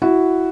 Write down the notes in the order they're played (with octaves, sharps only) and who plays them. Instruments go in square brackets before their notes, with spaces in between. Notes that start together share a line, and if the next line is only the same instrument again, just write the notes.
[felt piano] E4 F#4